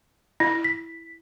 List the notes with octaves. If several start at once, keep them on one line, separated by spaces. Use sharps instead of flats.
E4
B6